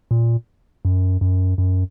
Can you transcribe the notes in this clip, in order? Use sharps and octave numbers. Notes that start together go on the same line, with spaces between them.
A#2
F#2
F#2
F#2